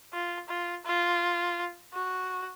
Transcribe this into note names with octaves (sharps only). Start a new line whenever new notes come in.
F4
F4
F4
F#4